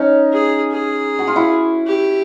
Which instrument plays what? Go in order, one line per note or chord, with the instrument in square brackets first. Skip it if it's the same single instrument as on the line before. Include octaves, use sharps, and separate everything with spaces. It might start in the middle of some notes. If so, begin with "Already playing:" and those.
Already playing: [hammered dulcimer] C#4 D#4
[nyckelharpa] G#4
G#4
[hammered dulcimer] F#4
F4
E4 F#4
[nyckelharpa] G4